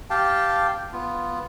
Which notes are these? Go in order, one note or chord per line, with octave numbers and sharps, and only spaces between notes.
G4 F5 G5 A5
B3 F4